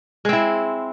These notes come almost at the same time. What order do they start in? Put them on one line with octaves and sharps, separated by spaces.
G#3 C4 E4